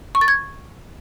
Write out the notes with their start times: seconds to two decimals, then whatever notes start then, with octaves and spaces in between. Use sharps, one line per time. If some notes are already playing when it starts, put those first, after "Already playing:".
0.15 C#6
0.21 A6
0.28 G#6